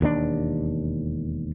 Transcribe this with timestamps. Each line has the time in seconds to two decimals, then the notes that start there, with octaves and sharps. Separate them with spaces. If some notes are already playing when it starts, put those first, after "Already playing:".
0.01 E1 D#2 C#3 D4